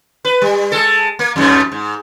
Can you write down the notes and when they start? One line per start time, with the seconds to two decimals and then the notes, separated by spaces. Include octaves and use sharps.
0.25 B4
0.42 G3
0.72 G#3 A4
1.19 A#3
1.36 F2 G#2 A3
1.72 G#2